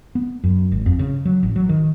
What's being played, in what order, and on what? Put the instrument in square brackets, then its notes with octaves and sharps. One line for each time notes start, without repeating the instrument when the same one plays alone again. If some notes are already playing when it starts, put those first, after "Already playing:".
[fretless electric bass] B3
F#2
G#1
F2
C#3
F#3
A1
F#3
D#3